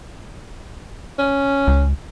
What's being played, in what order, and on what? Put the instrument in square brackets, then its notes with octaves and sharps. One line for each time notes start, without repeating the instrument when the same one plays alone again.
[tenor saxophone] C#4
[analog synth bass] C#2